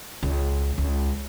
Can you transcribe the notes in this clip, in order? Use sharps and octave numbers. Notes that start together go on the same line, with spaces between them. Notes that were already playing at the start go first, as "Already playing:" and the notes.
C#2
C#2